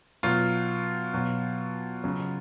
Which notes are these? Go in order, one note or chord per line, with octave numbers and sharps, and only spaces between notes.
B2 F#3 F4
B2 F#3
C#3 F#3